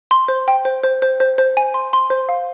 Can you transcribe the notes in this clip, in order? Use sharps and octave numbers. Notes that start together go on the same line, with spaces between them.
C6
C5
G5
C5
C5
C5
C5
C5
G#5
C6
C6
C5
F5